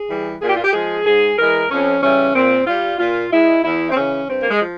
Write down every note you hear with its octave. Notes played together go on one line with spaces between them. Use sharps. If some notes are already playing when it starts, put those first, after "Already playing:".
Already playing: G#4
E3 G3
A#2 G#4
G4
F4
G4
F3 G#3 G#4
G#2 G#4
E3 G#3 A#4
F2 C#4
C#3 E3 G3 C#4
A#2 C4
G3 F4
A#2 F4
G#3 E4
E2 E4
C4
C#3 E3 C#4
G2 C4
A#3
G#3
F3